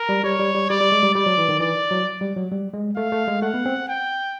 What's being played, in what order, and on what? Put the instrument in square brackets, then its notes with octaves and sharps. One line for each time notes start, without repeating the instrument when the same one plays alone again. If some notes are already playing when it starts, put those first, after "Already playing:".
Already playing: [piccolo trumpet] A#4
[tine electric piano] G3
[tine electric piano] G3 [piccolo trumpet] C#5
[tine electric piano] G3
G3
[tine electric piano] G3 [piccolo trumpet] D5
[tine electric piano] G3
G#3
G3
[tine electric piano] G3 [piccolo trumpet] D5
[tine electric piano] F#3
E3
D#3
[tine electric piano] E3 [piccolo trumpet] D5
[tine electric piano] F#3
G3
F#3
G3
G#3
[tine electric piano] A3 [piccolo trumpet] F5
[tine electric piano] A3
G#3
[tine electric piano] A3 [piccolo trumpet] F#5
[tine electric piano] B3
C4
[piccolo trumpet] G5